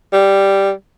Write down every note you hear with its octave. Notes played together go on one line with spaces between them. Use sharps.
G3